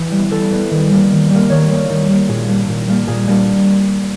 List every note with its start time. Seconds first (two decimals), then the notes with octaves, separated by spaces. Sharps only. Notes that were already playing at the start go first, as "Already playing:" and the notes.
Already playing: E3
0.12 G3
0.17 B3
0.31 E3 A4
0.52 G3 B3
0.71 D#3
0.90 G3 A#3
1.11 D#3
1.30 G3 A#3
1.50 D#3 C#5
1.70 G3 A#3
1.90 D#3
2.09 G3 A#3
2.28 A#2 G#4
2.48 G3 A#3 D4
2.68 A#2
2.88 G3 A#3 D4
3.07 A#2 G#4
3.28 G3 A#3 D4